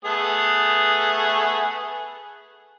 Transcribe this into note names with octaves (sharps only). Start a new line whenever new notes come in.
A3 B3 G#4